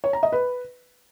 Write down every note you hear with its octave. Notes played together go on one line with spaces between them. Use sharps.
C#5
A#5
D#5
B4